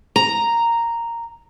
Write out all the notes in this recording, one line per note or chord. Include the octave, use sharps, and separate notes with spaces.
A#5